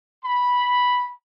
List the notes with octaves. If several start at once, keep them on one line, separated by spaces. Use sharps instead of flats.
B5